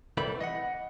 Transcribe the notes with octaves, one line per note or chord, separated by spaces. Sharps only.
C2 E3 G3 A3 B5
D#5 F#5